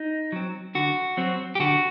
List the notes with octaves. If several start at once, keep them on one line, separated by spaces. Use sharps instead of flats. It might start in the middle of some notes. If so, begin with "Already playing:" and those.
Already playing: D#4
F#3 C4
D3 F#4
F#3 C4
G4
D3 F#4